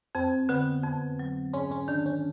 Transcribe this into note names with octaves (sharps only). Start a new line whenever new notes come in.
F2 C4
D3 B3
F2
F#3
G#2 C#4
C#4
D#3 D4
C#4